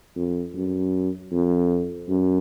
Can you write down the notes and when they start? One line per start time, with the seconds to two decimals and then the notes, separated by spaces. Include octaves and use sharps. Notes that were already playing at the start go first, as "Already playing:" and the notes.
0.16 F2
0.55 F#2
1.32 F2
2.09 F#2